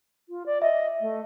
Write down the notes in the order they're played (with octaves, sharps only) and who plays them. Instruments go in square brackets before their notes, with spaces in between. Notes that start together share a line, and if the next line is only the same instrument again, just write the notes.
[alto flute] F4
D5
[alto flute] D#5 [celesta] E5
[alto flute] A3